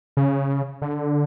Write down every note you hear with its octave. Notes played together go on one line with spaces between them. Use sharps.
C#3
D3